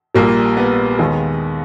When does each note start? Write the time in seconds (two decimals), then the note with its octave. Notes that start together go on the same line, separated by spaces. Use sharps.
0.15 A#1 A#2 G3 A#3
0.57 B3
0.99 D#2 D#3 G#3